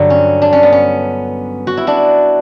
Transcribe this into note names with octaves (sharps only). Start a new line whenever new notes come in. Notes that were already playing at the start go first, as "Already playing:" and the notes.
Already playing: G2 D3 F#3
C#4
D4
C#4
B3
C#4
F#4
E4
D4 F#4